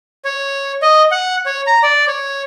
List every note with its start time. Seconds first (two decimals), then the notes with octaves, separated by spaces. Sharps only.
0.25 C#5
0.82 D#5
1.12 F#5
1.46 C#5
1.67 A#5
1.83 D5
2.08 C#5